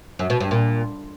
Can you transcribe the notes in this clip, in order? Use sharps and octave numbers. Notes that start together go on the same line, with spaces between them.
F#2
B2
G2
A#2